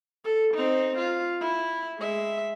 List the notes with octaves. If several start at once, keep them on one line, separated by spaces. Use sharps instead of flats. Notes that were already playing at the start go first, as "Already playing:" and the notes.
A4
C4 D#4
F4
E4
G#3 E5